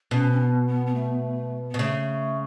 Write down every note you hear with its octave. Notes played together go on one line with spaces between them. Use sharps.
B2 C#4
C#4
B3
B3
B3
A3
B3
B2
C#3 A3